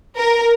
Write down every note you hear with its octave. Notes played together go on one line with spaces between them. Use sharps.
A#4